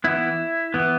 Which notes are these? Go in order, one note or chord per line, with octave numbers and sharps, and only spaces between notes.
E3 B3 E4
E3 B3